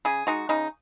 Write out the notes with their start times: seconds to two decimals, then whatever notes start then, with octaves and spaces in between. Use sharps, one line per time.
0.05 C#3 G#4
0.27 G#3 D#4 F#4
0.49 C#3 D#4